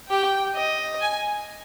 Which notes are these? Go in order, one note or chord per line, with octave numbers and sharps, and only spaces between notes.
G4 G5
D#5
G#5